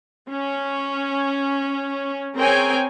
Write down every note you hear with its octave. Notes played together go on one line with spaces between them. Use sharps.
C#4
C4 G#4 A#4 C#5 G5 G#5